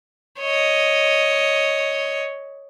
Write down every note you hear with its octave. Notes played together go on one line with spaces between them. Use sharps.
C#5 D#5